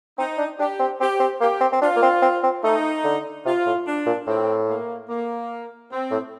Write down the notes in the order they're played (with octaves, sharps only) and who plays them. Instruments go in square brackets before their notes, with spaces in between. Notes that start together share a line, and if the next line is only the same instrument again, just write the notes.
[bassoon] C4 [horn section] D#4
[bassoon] D4
[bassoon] D4 [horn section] G4
[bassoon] C4
[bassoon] C4 [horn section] G4
[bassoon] C4
[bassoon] A#3 [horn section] G4
[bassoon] C4
C4
[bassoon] D4 [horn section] F4
[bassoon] A#3
C4
C4
C4
[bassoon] A3 [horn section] D#4
[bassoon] D3
[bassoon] C3 [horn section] F4
[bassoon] A2
[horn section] D4
[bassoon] A#2
[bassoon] A2 [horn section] C4
[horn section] A#3
A#3
C4
[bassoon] A2